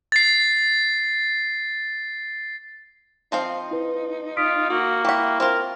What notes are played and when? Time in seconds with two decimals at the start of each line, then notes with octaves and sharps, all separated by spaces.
0.12 A6 C7
3.32 F3 C4 D#4 F5
3.71 E4 B4
4.37 F4 D#6 B6 D7
4.70 A#3 F#4
5.05 E4 G4 F#5 G5 C#6 B6
5.40 C4 F4 A#4